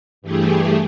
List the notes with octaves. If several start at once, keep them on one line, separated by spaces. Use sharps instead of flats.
G2 E3 A3 G4 G#4